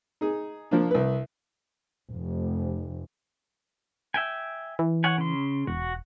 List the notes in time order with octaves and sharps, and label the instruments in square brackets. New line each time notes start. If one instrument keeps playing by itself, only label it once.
[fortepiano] D#4 G#4
F3 A#3 D4
C2 B4
[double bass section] F1
[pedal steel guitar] E5 G5 G#5
[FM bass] E3
[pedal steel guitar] C#5 F#5 G#5
C#3 C6
[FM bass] E1 [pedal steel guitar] F#4